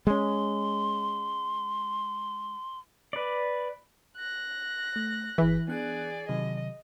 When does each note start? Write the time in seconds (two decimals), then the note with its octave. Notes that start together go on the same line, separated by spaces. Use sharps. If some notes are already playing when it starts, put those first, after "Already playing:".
0.07 G#3 C#4 C6
3.13 B4 D5
4.17 F#6 A#6
4.96 A3
5.38 G1 E3 G#4 B6
5.68 B3 D4 G#4 D5 F#6
6.29 C3 D#3 F#3 D#5